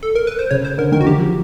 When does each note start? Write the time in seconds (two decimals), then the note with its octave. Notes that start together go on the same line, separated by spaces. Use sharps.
0.03 A4
0.15 A#4
0.27 B4
0.39 C5
0.51 C#3 C#5
0.65 C5
0.78 D3 A#4
0.92 D#3 A#4
1.01 F#4
1.07 E3 G4
1.15 F3
1.25 F#3